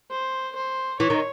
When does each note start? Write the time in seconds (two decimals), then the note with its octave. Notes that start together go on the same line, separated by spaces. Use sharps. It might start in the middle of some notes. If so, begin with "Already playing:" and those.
0.11 C5
0.55 C5
1.00 E3 C#5
1.10 D#3